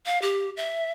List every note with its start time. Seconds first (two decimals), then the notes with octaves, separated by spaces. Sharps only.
0.06 F5
0.22 G4
0.57 E5